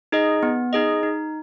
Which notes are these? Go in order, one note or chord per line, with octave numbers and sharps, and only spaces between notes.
D#4 G#4 D#5
B3
D#4 G#4 D#5
D#4